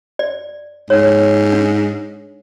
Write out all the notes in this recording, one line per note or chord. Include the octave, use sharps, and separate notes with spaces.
D5
G#2 C#5
D4